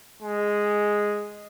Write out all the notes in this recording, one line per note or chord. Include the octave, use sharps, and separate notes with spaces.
G#3